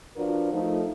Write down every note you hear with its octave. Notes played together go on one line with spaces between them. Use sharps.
F3 D4 F4 F#4 A#4 B4
F3 A3 D#4